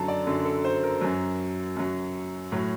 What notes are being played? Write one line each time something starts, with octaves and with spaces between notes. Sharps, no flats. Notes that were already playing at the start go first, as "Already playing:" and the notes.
Already playing: F#2 D3 F#3 A5 A#5
D5
F#2 D3 F#3
A4
C5
A#4
F#2 F#3
F#2 F#3
A2 F#3